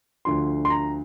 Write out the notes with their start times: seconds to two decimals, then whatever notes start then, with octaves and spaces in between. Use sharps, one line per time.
0.25 D2 D3 F3 C6
0.65 C6
0.70 A#5